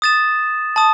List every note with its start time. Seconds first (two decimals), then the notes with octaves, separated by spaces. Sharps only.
0.02 D#6 A6 E7
0.76 A5 D#6